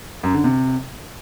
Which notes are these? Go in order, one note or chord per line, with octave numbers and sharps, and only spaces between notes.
F#2
D3
C3